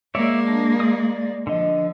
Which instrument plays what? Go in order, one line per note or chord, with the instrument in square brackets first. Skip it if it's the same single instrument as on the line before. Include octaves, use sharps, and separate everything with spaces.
[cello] G#3 A#3 [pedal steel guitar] C#5 D5 E5
[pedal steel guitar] D4
D5 D#6
[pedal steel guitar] D3 D#5 [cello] F3